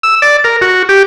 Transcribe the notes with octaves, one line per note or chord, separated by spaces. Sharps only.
E6
D5
A#4
F#4
G4